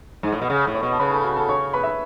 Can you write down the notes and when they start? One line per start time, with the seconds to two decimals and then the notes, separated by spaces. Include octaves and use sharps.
0.23 G#2
0.32 A2
0.42 B2
0.50 C#3
0.67 A2
0.75 C#5 C#6
0.83 B2
0.92 A5
0.99 C#3 B4 B5
1.11 A4 A5
1.24 F#4 F#5
1.36 A4 A5
1.49 C#5 C#6
1.73 B4 B5
1.83 E5